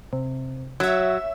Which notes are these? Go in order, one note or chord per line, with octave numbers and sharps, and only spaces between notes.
C3
F#3 C#5 E5 E6